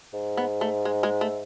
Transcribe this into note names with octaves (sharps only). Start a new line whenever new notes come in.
G#2
B3
A3
G#3
G#3
A3